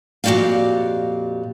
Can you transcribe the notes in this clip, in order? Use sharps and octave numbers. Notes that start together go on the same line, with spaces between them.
F2 A#2 F#4 G4 D5 F5